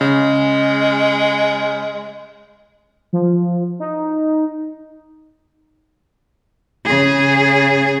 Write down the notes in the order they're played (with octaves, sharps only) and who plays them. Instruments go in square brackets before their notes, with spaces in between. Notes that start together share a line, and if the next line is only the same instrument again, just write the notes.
[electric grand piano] C#3 [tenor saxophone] G#3
[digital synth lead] F3
D#4
[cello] C#3 G#4